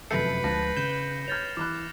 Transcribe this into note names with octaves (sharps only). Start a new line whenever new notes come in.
F1 F#2 A4 B4 E5 G6 C7 C#7
D2 F3 G#3 A5 F#6 A#6
C#3 G6 E7
C#5 F6 G#6 A6 F7
E3 B5 D6 F6 F#6